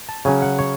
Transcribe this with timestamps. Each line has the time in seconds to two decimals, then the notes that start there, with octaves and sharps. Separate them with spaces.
0.09 A5
0.25 C#3 F#3 C#4 G#5
0.42 F#5
0.59 C#5